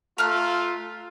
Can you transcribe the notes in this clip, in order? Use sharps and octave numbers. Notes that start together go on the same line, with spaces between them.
A3 F4 A#5 F6 F#6